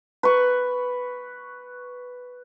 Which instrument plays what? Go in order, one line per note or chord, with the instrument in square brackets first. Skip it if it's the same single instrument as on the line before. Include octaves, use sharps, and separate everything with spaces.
[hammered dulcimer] B4 C#6